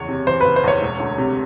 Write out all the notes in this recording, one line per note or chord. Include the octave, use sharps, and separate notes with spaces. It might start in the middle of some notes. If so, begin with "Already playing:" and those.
Already playing: F#1 E2 C#5
C3
E3 C5
F#1 B4
C5
E2 C#5
E1
D2
C3